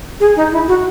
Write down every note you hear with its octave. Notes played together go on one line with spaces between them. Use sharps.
G#4
D#4
E4
F#4